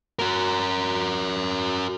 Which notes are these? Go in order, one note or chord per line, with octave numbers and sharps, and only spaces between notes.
F#4 A#4